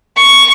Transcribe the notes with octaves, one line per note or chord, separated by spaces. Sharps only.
C#6